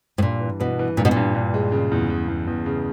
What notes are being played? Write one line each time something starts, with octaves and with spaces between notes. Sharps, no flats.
A2
G2 A#2
E3
B2 E3
E3
G2 A#2
B2
A#2
G2
G2
G#3
C#3
E2
E2
E2
E2
C#3